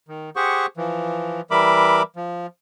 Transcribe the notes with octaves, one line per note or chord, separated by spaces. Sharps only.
D#3
G4 G#4 C5 F#5 C#6
E3 F3
E3 G3 A#4 E5 B5 D6
F3